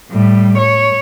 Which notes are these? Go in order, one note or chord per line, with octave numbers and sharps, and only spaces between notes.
A2 G3
C#5